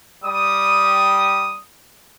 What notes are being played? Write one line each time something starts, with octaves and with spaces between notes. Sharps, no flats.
G3 D#6